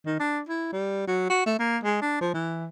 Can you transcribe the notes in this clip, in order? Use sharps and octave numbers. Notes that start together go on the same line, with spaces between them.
D#3
D4
E4
G3
F#3
F#4
A3
A#3
G#3
D4
F3
E3